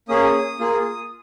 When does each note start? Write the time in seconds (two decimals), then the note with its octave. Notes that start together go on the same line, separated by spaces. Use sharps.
0.08 A#3 C#4 G#4 D#6
0.60 A#3 F4 G#4